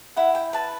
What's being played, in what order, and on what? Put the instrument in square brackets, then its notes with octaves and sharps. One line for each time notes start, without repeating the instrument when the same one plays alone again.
[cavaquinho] E4 F#5
G5
B4 A5